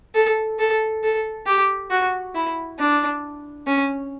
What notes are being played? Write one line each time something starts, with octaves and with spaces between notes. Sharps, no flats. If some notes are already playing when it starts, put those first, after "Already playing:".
A4
A4
A4
G4
F#4
E4
D4
C#4